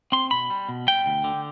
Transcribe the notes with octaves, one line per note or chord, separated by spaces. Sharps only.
C4 C6
B2 B5
G3
B2
G3 G5
D2
D3